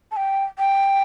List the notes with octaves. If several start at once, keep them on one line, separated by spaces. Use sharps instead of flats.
A5
G5
G5